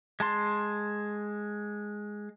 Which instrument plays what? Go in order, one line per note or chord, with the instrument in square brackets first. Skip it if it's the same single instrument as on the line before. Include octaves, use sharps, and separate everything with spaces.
[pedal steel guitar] G#3 A5 C6